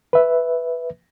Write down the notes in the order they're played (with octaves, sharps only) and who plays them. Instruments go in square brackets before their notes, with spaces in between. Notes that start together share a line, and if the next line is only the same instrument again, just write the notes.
[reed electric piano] B4 E5